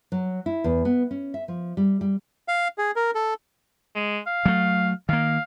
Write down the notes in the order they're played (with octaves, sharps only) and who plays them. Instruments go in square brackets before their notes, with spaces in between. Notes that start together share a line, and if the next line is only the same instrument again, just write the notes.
[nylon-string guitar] F#3
E4
E2
B3
C#4
E5
F3
G3
G3
[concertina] F5
G#4
A#4
A4
[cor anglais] G#3
F5
[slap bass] F#3 A3
[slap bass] D#3 A#3 [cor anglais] F5